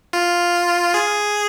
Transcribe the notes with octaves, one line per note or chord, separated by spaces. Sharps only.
F4
G#4